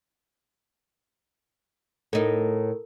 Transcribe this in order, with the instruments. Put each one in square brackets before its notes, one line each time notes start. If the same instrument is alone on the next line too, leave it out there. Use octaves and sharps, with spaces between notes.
[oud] A2 D#4 [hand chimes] A4 A#4